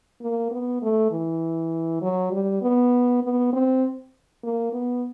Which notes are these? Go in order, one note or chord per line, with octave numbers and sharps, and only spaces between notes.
A#3
B3
A3
E3
F#3
G3
B3
B3
C4
A#3
B3